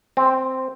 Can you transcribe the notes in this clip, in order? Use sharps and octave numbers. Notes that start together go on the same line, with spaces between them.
C4